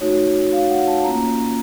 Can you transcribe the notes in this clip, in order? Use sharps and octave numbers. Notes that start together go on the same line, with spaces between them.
A3 D#4 F#4 C#5
F5
F#5
A5
A#3 C#4 F4 A#5